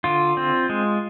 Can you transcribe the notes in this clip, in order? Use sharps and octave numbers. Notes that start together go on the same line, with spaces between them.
D3 F4
C4
G#3